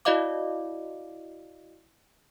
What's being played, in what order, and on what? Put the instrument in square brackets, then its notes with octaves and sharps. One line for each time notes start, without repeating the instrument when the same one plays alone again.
[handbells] E4 F#4 D5 D#5 F5 D6